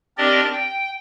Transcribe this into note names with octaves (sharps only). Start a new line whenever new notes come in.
C4 D4 G4 A#4 D5 D#5
G5